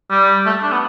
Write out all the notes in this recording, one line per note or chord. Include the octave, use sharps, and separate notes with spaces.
G3
A3
D4
B3